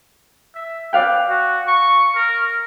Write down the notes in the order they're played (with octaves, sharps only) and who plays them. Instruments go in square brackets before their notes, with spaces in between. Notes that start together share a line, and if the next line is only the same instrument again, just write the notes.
[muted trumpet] E5
[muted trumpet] B4 [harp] D5 F5 G5
[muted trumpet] F#4
C#6
A#4